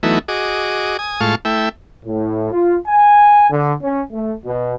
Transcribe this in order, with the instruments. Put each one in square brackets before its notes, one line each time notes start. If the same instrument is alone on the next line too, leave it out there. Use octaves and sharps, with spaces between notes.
[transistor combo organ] E3 F#3 A3 B3 D#4 E4
F#4 G#4 D#5 D6
G#5 D#6
A2 G#3 F4 F5 A5 C#6
A3 E4 E5 G5
[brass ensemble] A2
F4
G#5
D3
C#4
A3
B2